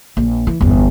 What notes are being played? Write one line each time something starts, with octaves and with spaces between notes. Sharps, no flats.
A#1
E3
G1 E2